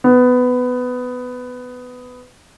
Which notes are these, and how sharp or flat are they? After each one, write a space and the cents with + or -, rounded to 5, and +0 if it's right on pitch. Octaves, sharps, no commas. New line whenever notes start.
B3 +15